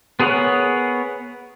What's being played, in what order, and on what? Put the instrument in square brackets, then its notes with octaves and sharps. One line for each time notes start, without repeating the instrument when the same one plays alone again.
[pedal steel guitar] B3 G#4 A#4 C#5 F#5